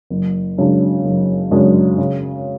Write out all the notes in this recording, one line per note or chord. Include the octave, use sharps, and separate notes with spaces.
F#1
F#2 C#3 G#3 D4
F#1
F#2 C#3 G#3 D4
C#3